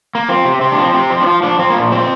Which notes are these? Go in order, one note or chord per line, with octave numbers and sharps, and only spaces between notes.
A#3
F3 C4
C3
C3 C4
D4
F3 C4
C3 C4
F3
D4
F3 F4
F3 D4
F3 C4
A#3
A#2
F3 C4